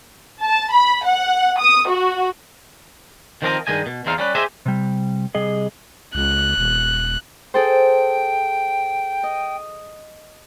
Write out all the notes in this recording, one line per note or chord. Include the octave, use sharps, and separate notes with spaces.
A5
B5
F#5
D#6
F#4
D#3 F3 B3 C4 A#4 D#5
G2 D#3 G#3 D#5 G#5
B2
E2 C4 D#4 F5
G3 C#4 B4
G4 G#4 C5 D#5 E5
C3 G3
C3 G3 G#4 D#5
C#2 F#6
D#1
G#4 A4 C5 G5
D#5